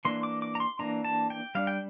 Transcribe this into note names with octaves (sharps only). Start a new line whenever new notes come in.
E3 A#3 D4 C6
D6
D6
A#5
C6
E3 A#3 D4 A#5
A5
G5
G3 D4 F5
G5